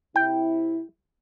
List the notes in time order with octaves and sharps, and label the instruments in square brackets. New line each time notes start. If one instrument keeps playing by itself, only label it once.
[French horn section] C3 E4 [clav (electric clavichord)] G5